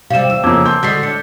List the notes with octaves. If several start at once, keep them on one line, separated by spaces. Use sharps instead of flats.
C3 G3 F5 E7
E2 E6
F2 C#3 A#3 D6 E6 G#6
A5 C6 G6
D3 G#3 F#4 G6 B6 C7
D4 C#7